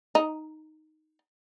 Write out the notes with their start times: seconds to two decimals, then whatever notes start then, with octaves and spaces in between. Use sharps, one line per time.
0.15 D#4